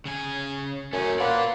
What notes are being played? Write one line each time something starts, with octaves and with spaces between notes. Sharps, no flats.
C#3 G#5
F#2 A3 C#4 G#5
A#3 F4 B4 D5 F#5 C6